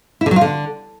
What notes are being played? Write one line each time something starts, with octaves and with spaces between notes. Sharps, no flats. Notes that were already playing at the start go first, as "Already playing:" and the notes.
E4
D3
F#3
F4
D3